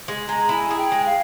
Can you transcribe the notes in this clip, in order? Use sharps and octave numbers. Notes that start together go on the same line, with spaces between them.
G#3
G#3 A#5
E4 G#5 A#5
G#4
G5
G#3
F5